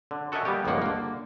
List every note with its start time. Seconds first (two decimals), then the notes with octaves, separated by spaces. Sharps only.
0.11 D3
0.32 F#4 A4 A#4 D#5 E5 G#5
0.45 G3 A#3 B3 G4
0.65 G1 C#2 D#3 F3 A#3 F#5
0.82 D3 A#3